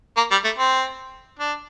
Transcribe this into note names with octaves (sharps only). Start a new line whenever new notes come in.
A#3
G3
A3
C4
D4